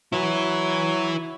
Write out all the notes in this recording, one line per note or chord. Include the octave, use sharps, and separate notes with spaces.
F#3 E4 B4